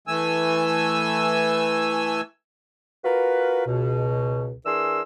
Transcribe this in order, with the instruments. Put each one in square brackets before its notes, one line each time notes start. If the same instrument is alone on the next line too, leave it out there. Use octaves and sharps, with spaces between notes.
[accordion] E3 A3 G#5 E6
[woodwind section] F4 F#4 A#4 B4
C#2 B2
E3 D4 G#4 A#4 C6 E6